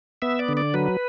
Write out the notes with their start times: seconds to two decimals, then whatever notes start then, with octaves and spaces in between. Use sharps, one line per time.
0.22 B3 E5
0.39 D5
0.48 D3
0.57 D5
0.74 F#3 B4